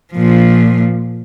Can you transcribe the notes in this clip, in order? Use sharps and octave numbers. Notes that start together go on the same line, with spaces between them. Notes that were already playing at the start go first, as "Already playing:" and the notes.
A#2 F3